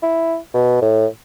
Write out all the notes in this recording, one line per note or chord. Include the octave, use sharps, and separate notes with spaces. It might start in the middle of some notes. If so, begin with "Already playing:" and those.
E4
B2
A2